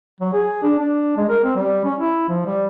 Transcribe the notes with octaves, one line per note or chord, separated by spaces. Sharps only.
F#3
G#4
D4
D4
G#3
A#4
C4
G3
C#4
E4
F3
G3